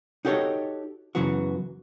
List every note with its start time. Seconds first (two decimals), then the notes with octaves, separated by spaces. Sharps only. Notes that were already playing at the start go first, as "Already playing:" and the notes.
0.25 D#4 F#4 G4 A4 C#5 D#5
1.15 F#2 C#3 E3 F#3 B3 F#4